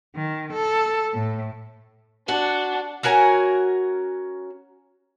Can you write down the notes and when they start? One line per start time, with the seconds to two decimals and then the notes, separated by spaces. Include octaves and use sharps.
0.16 D#3
0.52 A4
1.13 A2
2.28 D4 F#4 F#5
3.03 C#4 F#4 A#4 G#5